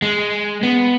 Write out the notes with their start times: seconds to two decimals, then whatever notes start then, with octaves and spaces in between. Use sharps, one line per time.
0.02 G#3
0.63 B3